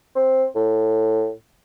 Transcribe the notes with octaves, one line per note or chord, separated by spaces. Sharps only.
C4
A2